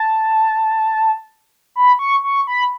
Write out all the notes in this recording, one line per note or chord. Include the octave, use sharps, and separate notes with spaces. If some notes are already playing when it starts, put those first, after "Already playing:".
Already playing: A5
B5
C#6
C#6
B5